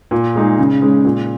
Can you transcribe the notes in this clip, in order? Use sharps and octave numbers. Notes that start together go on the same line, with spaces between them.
A#2
G#3 D#4 G#4
C#3
G#3 C#4
A#2